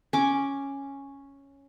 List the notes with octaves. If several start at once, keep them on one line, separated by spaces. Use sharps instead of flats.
C#4 D6